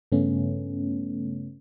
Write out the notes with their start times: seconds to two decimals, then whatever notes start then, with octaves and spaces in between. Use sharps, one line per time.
0.12 G2 C#3 A3 B3 C#4